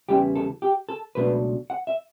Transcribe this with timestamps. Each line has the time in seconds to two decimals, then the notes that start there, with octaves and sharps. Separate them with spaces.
0.09 E2 C#3 G3 B3 E4 G4
0.35 A4
0.62 G4
0.89 A4
1.15 C#2 B2 F#3 A3 D4 B4
1.70 F#5
1.87 E5